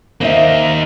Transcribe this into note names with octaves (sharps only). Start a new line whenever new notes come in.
A#3 D#4 C5 E5